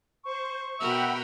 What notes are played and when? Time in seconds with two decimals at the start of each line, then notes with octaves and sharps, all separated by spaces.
0.24 C5 C#6
0.80 B2 F#4 A#4 E5 F#5 G5 B5